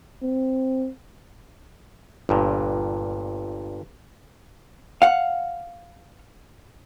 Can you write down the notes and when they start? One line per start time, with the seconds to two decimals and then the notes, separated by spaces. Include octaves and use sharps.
0.22 C4
2.29 G1 G2 A#2
5.02 F5 F#5